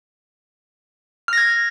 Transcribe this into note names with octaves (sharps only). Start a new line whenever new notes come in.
F6 G#6 A#6